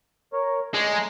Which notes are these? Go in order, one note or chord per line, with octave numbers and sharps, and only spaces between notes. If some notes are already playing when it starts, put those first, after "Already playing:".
A#4 C#5
G#3 D5
A3 A#5 C6